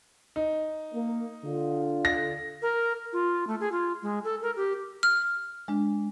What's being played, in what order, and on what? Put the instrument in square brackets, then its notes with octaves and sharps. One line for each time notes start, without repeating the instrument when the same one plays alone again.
[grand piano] D#4
[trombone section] A#3
D3 F4
[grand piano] A#6
[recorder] A#4
F4
A3
G#4
F4
G#3
A4
A#4
G4
[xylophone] F6
[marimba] G#3 D4